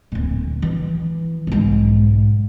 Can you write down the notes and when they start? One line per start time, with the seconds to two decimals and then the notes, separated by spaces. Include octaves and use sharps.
0.12 D1 A#2
0.62 E3
1.47 B1 G#2